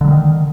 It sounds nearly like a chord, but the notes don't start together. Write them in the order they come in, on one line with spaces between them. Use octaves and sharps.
D3 F#3 G3 D#3